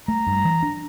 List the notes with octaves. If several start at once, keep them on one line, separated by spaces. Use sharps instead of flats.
A3 A#5
G2
E3
D4